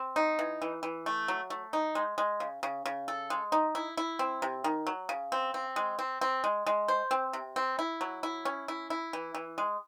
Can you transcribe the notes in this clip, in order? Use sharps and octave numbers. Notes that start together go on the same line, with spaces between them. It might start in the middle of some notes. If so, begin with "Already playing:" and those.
Already playing: C4
D#4
E3
E3
E3
A3
F#3
A3
D#4
G#3
G#3
C#3
C#3
C#3
A4
G#3
D#4
E4
E4
C4
C3
D#3
F#3
C#3
C4
C4
G#3
C4
C4
G#3
G#3
C5
C4
C3
C4
E4
F#3
E4
C#4
E4
E4
E3
E3
G#3